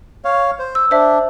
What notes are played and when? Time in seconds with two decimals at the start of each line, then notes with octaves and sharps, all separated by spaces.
0.24 C#5 F5
0.59 C5
0.75 E6
0.91 D4 C5 E5